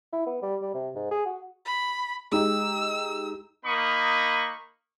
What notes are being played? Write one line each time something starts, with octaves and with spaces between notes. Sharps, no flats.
E4
B3
G3
G3
C3
G#2
G#4
F#4
B5
G#3 D#4 G4 E6
A#3 D#4 B5 C#6 D#6